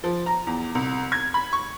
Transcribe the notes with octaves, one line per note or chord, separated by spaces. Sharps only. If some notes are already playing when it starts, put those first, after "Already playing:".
F3
A#5
E2
C2
G#6
B5
C#6